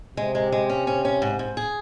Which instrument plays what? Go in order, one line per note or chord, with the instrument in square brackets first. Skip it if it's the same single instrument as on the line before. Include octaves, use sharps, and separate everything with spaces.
[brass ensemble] C3 [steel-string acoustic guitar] G#3
[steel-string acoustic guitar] G#3
G#3
C#4
C#4
C#4
G#2
G#2
G#4